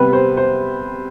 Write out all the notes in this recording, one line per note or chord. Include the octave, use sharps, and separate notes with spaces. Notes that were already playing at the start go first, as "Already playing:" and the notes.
Already playing: C3 G3 B3 B4
C5
C5